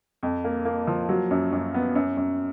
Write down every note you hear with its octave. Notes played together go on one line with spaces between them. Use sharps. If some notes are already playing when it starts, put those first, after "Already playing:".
F2
A#3
A#3
F3
F#3
F#2
F#2
B3
F#2
F#2